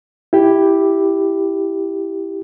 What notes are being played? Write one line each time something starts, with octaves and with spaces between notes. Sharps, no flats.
E4 G4